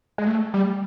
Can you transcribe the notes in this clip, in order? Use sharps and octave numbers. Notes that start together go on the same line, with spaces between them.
G#3
A3
G3